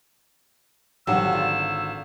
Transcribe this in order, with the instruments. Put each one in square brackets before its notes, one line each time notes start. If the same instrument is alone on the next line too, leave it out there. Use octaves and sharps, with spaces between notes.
[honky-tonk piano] G#1 [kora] D3 F#3 G3 [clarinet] E6
[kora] F4